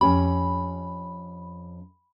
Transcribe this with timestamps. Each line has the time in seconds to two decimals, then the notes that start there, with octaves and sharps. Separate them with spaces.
0.01 F2 C#4 G4 B5